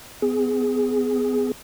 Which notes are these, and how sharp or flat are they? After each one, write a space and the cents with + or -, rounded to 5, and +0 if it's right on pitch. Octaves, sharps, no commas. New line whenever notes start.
B3 +35 G#4 +0